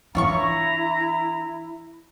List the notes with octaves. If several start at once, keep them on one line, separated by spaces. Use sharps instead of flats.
E3 D4 E4 F4 C#5 A#5 C#6